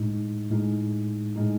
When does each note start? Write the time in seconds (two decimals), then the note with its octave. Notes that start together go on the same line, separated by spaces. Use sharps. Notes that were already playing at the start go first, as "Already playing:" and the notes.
Already playing: A2 G#3 D#4
0.50 A2 G#3 D#4
1.36 A2 G#3 D#4